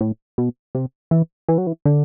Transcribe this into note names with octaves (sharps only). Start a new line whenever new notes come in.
A2
B2
C3
E3
E3
F#3
E3
D3